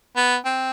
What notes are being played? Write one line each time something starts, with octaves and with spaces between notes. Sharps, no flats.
B3
C4